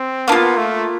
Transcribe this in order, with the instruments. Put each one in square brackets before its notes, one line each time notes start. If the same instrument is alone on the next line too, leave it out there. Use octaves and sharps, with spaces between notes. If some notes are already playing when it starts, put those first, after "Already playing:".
Already playing: [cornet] C4
[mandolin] A#3 D4 [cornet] B3
[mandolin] F4
[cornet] A3